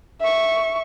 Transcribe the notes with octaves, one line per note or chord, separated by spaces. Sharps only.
E5 C#6